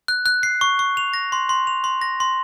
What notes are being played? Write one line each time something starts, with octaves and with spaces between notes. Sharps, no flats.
F#6
F#6
C7
C#6
C#6
F7
A#6
C6
C6
F7
C6
A#6
C6